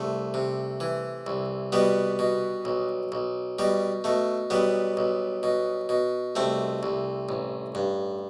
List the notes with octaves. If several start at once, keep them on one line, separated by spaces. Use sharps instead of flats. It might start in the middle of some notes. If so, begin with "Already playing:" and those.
Already playing: C2 A3
C3
E3
C2
B2 G3 B3
B2
B1
B1
B2 G3
B2 A3
B1 G3 B3
B1
B2
B2
C2 A3 C4
C2
A1
G2